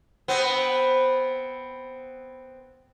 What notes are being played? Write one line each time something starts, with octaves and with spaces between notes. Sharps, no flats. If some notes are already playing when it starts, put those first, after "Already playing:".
B3 C4